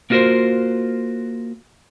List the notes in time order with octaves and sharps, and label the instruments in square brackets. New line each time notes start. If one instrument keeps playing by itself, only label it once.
[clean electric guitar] A#3 B3 F4 F#4 A#4 C5